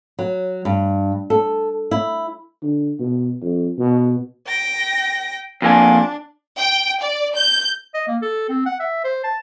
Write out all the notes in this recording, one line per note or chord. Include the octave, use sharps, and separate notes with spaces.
F#3
G2
A4
E4
D3
B2
F2
B2
G5 A#6
F2 A#3 D4 G#5
G5
D5
G6
D#5
A#3
A4
C4
F#5
E5
C5
A5